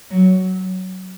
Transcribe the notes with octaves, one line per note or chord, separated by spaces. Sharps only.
F#3